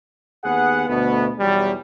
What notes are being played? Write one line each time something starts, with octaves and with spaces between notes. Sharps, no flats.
D#2 B3 G#4 F#5
D2 B2 A3 B3
B1 E2 E3 F#3 G3